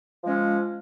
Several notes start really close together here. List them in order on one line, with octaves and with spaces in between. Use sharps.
F3 G#3 C#4